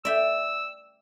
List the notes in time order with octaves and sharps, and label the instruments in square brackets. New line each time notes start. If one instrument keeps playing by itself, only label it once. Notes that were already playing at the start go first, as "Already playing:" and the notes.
[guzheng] D5 E5 G5 [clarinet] E6